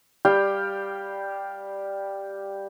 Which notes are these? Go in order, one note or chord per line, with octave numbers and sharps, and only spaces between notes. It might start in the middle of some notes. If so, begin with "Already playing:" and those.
G3 G4 F5 G5